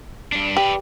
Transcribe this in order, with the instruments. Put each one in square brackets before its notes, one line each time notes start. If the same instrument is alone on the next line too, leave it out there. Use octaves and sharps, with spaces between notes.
[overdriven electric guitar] G2 D4
[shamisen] G4 [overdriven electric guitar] B4 D5